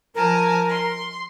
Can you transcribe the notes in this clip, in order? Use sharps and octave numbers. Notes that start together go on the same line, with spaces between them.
F3 A#4 G#5 A5
C6